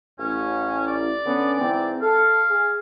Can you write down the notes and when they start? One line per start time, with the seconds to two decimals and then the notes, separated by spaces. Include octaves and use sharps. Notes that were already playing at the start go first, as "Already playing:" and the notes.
0.19 A1 C#4
0.86 D5
1.26 D3 B3 C#4
1.60 G#2 E3 C4
2.02 A4 F5
2.50 G#4